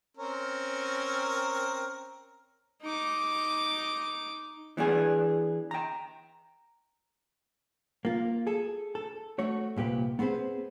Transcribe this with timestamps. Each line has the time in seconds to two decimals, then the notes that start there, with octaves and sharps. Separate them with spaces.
0.17 C4 C#4 A#4
2.82 D#4 D6
4.77 E3 B3 D4 G#4
5.71 G5 A#5
8.05 A#3 F4
8.47 G#4 A4
8.95 A4
9.39 A3 F#4 C#5
9.76 C2 A#2 G4 B4
10.19 B3 C4 G#4 B4 C5